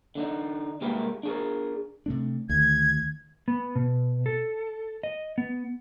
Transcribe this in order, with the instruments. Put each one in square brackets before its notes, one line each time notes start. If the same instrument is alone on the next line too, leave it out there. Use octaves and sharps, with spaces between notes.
[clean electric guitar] D3 D4 D#4
C2 G#3 A#3 G4 A#4 B4
D4 G#4 A#4
[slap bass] C3 A3 D4
[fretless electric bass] D2 [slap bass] D#3 [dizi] G#6
[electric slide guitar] B3
B2
A4
D#5
B3